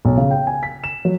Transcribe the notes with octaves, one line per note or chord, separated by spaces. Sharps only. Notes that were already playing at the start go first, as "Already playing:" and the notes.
B1
C#3
G5
G#5
B6
E7
F#3